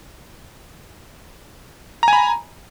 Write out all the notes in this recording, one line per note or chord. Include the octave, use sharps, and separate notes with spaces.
G#5 A#5 B5